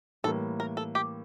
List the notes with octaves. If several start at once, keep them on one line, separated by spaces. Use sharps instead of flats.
A2 E3 G3 A#3 A4
A#4
A4
G4